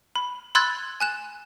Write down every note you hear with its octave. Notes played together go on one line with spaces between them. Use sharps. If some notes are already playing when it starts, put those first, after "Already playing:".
B5
B5 C6 E6 F#6 G#6 A6
G#5 F#6 E7